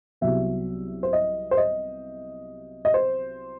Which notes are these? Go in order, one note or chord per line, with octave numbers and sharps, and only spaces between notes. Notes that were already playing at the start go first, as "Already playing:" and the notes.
C2 C3 F#3 B3 E5
C5
D#5
C5
D#5
D#5
C5